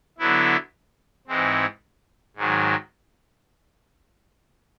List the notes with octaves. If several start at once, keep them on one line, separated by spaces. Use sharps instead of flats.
D3 F#3 B3 E4
G#2 E3 G#3 C4
G#2 D#3 F#3